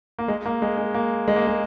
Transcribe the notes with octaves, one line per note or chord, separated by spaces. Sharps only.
A#3
G#3
A#3
G#3
G#3
A#3
G#3
A#3
G#3